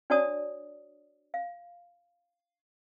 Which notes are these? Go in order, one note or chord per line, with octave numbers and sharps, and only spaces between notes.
D4 F#4 C#5 D5 A5 D#6
F5